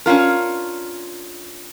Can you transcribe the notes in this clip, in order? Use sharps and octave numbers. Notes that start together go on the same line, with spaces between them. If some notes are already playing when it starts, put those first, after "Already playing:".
C#4 D4 F4 A#4